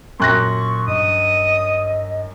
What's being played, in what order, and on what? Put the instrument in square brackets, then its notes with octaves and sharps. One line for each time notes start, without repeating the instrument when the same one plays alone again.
[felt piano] F#2 F#6 A#6 [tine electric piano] A#2 C6 [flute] C#6
[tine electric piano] G2 [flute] D#5 [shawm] D#6